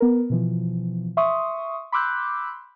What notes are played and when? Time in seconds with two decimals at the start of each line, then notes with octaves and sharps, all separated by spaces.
0.01 B3 A#4
0.30 B2 E3 F3
1.17 E5 C6 C#6 D#6
1.92 B5 C6 D6 E6 F#6 G6